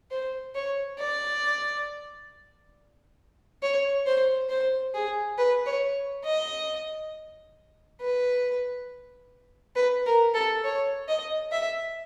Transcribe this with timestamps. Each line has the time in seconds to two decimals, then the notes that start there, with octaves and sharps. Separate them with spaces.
0.11 C5
0.55 C#5
0.98 D5
3.62 C#5
4.06 C5
4.49 C5
4.94 G#4
5.38 B4
5.66 C#5
6.25 D#5
8.01 B4
9.75 B4
10.06 A#4
10.34 A4
10.64 C#5
11.08 D#5
11.52 E5